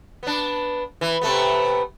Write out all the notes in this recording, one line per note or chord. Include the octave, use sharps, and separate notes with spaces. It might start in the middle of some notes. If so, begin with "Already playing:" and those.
B3 D4
E3
C3 A3 B3